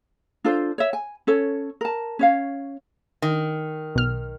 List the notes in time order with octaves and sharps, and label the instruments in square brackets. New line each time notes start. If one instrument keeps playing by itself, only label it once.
[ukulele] D4 F4 A4 C5
C#5 E5
G#5
C#4 A4 C#5
A#4 A5
C#4 C#5 F5
[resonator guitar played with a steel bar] D#3
[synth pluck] B1 F6